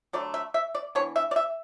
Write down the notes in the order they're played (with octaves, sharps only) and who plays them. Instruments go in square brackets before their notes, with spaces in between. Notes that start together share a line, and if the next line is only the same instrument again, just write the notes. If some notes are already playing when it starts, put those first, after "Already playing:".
[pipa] D3 F#3 A3 D5
E5
E5
D5
E3 B3 D4 C#5
E5
D5
E5